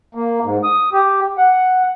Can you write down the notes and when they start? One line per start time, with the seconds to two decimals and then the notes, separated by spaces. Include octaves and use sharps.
0.15 A#3
0.43 G#2
0.64 D#6
0.93 G4
1.38 F#5